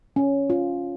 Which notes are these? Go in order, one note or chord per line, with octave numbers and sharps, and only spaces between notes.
C#4
F4